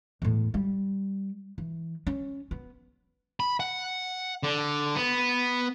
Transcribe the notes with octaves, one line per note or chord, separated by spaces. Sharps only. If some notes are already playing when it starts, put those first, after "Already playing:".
E2 A2
G3
E3
C#4
B3
B5
F#5
D3
B3